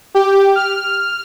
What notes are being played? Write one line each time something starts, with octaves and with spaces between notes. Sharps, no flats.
G4
F6